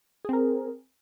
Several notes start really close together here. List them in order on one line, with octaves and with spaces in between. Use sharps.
G#4 C4 A#4